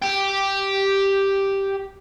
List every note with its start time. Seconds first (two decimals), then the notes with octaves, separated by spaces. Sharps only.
0.02 G4 G5